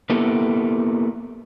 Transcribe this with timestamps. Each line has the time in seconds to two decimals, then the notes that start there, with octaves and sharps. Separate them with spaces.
0.10 A#3 B3 E4 G4 A4